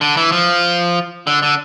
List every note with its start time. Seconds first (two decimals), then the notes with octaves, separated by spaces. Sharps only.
0.01 D3
0.17 E3
0.32 F3
1.27 D3
1.43 D3